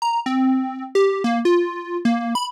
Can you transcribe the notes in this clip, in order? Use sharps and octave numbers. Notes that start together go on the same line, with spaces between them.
A#5
C4
G4
A#3
F4
A#3
B5